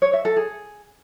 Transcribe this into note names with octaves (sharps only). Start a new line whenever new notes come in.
C#5
E5
A4
G#4